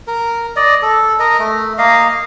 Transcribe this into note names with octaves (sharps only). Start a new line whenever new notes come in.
A#4
D5 D#5
A4
A#4 D#5
A3
A#3 D#5 F5